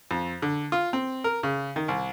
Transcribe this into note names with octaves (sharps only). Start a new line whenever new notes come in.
F2
D3
F4
C4
A#4
C#3
D#3
C2